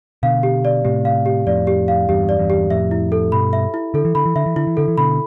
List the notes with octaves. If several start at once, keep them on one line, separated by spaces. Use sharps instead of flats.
B2 D3 F5
G4
D5
A2 C3 G4
F5
G4
F2 A2 D5
G4
F5
E2 G2 G4
D5
E2 G2
G4
F2 A2 E5
E4
A4
G2 B2 B5
E5
E4
D3 A4
E3
D3 B5
E3
D3 E5
E3
D3 E4
E3
D3 A4
E3
B2 D3 B5